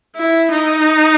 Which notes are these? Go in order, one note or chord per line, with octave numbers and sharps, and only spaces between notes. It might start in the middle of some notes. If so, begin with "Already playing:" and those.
E4
D#4